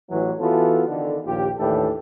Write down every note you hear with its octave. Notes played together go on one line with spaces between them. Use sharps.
A1 E3 F#3
E3 B3 F4 F#4 A4
D3 D#3
A#1 D#2 F4 G4
D#2 A2 E3 D4 G4 A4